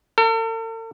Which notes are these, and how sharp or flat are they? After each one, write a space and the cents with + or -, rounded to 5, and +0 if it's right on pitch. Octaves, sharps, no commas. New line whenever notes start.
A4 +45